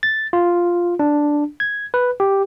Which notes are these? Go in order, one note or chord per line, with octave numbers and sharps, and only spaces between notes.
A6
F4
D4
G#6
B4
G4